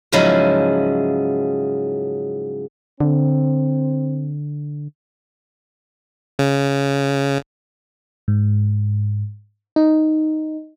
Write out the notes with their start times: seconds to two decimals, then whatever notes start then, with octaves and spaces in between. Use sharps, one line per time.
0.12 G#2 C#3 F3 F#3 G#3 E4
3.00 D3 C4
6.39 C#3
8.28 G#2
9.76 D#4